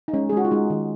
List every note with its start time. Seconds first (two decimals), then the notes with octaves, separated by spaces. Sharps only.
0.08 D#4
0.14 G#3 C#4
0.29 G#4
0.33 G#3 F#4
0.45 F4
0.51 G#3 D#4
0.70 D#3